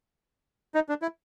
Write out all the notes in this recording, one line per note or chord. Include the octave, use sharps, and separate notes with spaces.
D#4
D4
E4